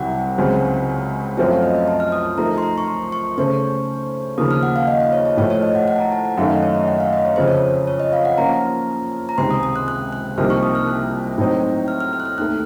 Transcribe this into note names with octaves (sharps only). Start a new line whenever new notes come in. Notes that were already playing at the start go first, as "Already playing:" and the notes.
Already playing: C2 C3 F#3 F#5
C#2 C#3 F#3 C4
F#2 F3 A3 C4 F#4 C#5
F5
D#5
D#5
A5
F6
D#6
F3 A3 D#4 A#4 A#5
C6
A#5
C#6
C6
C#6
C#3 A3 C#4 A4 C5 C#6
D#2 C#3 F3 A#3 D#6
F6
F#5
F5
D#5
D#5
C#5
C#5
A2 F3 A3 C#5
C#5
D#5
F#5
F#5
A5
A#5
A5
F#5
F#2 D#3 A3 F5
D#5
C#5
D#5
F#5
F5
D#5
C#5
F2 C#3 F3 C5
C#5
C#5
D#5
F5
F#5
F3 A#3 C#4 F4 A#5
A#5
C#2 C3 D#3 C6
D#6
D#6
F#6
F#6
F#6
C2 C3 F3 A#3 D#4 F6
C#6
D#6
F6
F#6
A2 F#3 C4 D#4
F6
F6
F6
F#6
F6
D#2 D#3 A3 F#6